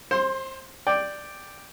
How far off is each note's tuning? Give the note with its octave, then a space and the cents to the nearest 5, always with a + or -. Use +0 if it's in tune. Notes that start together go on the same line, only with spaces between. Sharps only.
C5 +25 C6 -5
D5 +5 G5 +0